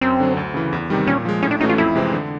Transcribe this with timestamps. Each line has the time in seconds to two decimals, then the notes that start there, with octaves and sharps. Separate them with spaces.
0.01 F#2 C4
0.20 D3 F#3
0.37 D2
0.54 C#3 E3
0.73 E2
0.90 C3 D#3 G3
1.07 A#2 C#4
1.25 F3 G#3
1.42 A2 C#4
1.51 D4
1.60 E3 A3 C#4 D#4 F#4
1.69 F4
1.78 F2 E4
1.96 C3 E3 G#3 C4
2.13 D3